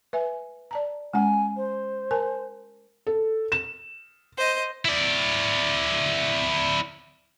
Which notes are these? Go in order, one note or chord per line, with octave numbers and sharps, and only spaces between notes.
B4 E5 G#5
D5 A5 A#5
G#3 C#4 F#5 G#5
C5
A#4 G#5 A5
A4
E7
C5 D#5
E4 D5